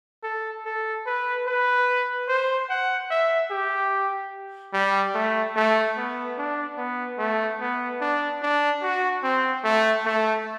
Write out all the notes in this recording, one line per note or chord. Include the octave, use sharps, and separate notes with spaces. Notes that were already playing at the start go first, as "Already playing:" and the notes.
A4
A4
B4
B4
C5
F#5
E5
G4
G3
A3
A3
B3
D4
B3
A3
B3
D4
D4
F#4
C4
A3
A3